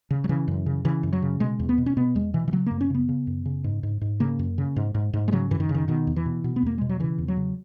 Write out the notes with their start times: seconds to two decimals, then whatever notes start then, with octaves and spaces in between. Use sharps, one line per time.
0.11 C#3
0.24 F#3
0.29 C#3 E3
0.48 F#2
0.66 C#3
0.85 C#3 E3
1.03 F#2
1.13 F#3
1.22 C#3
1.40 B2 G#3
1.59 E2
1.69 B3
1.78 B2
1.86 C#4
1.97 B2 B3
2.15 E2 G#3
2.34 B2 E3
2.48 E3
2.52 C#3 F#3
2.66 F#2 A#3
2.81 C#4
2.90 C#3 B3
3.09 C#3
3.27 F#2
3.46 C#3
3.64 G#2
3.83 G#2
4.01 G#2
4.20 C#3 A#3
4.39 F#2
4.58 C#3
4.76 G#2
4.95 G#2
5.13 G#2
5.28 G#3
5.32 C#3 F#3
5.51 F#2 E3
5.60 D#3
5.69 C#3
5.74 D#3
5.88 B2 D#3
6.07 E2
6.16 E3
6.26 B2
6.44 B2
6.56 B3
6.62 E2 A#3
6.78 B2 G#3
6.89 F#3
7.00 C#3 E3
7.18 E2
7.28 F#3
7.37 C#3